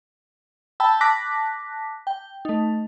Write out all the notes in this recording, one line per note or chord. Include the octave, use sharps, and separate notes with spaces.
G5 A5 B5 E6
A5 D6 F#6 A#6 B6
G5
A3 D#4